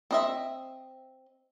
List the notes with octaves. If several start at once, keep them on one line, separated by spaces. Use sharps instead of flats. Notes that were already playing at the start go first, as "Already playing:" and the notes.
C4 D#5 E5